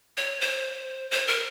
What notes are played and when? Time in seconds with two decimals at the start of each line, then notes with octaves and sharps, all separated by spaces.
0.17 C#5
0.41 C5
1.11 C5
1.27 A#4